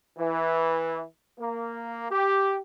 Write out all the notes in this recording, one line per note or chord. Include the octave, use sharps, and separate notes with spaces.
E3
A#3
G4